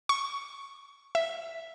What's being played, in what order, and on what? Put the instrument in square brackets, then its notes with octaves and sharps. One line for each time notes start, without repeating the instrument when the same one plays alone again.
[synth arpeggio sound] C#6
E5